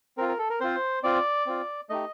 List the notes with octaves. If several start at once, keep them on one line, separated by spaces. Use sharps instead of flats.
C4 F4 A#4
A#4
A4
A#4
C4 F4 C5
C4 F4 D5
C4 F4
A3 D#4 G4 D#5